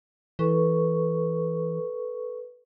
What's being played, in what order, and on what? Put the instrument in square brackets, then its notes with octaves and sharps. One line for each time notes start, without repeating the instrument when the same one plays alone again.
[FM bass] E3 [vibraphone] A4 B4 C#6